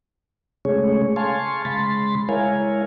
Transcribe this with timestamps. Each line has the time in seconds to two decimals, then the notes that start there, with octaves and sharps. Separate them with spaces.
0.65 C#3 G#3 A3 C#4 G#4 C#5
1.16 F5 G#5 A5 C6 C#6
1.65 C#3 G#3 B5 C6 A6
2.29 G#3 E4 A#4 C#5 F5 G#5